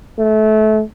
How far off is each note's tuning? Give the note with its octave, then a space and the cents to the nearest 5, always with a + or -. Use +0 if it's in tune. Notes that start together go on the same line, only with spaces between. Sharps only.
A3 -25